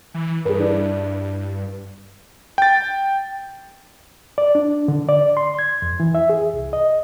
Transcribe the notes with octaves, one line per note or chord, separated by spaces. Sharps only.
E3
G2 G#4 A#4 B4
D4 E4
G5 A6
D5
D4
D3
D5
C6
G#6
F2
E3
E5
G#4
C2
D#5